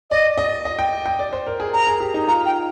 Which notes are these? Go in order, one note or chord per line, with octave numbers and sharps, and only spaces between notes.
D5 D#5
D#5
D#5
G5
G5
D5
C5
A#4
G#4
A#4 A#5
G#4
G4
D#4
F4 A#5
G5